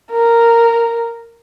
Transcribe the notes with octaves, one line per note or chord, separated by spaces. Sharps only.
A#4